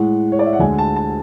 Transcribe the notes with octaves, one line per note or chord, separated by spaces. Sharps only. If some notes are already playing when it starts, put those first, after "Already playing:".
Already playing: A2 G#3 F#5
C#5
D5
E5
F#5
D2 D3 G#3 G#5
A5
A5